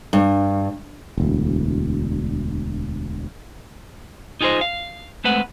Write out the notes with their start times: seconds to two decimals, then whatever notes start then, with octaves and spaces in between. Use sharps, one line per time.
0.13 G2
1.18 E1 D2
4.41 D#4 F4 G#4 A4 C5 D#5
4.61 F5
5.24 G#3 A3 C4 B4 F#5